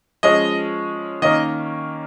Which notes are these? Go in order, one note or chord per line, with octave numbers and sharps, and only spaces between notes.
F3 G#3 C#4 D#5
D#3 A#3 C#4 D#5